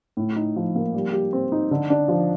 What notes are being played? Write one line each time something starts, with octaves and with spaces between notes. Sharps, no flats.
A2
D#4
F3
A#3
G3
G4
C4
D#4
D3
D4
F3